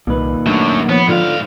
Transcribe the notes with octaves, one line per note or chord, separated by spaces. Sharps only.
C2 A#2 D#3 B4
F#2 F#3 A3 D4
F3 B3 C#5
G#2 D3 F4 F5